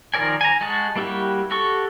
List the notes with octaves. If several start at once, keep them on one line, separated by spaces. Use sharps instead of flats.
D#3 F3 A#4 D5 G#5
G#5 A#5
G#3 F#4 G#4 A5
G3 A#3 E4 F#4 G4
F#4 G4 A4 C#6